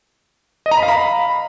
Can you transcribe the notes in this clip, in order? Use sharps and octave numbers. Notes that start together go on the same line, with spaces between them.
D#5
A#5
B5
F5
B5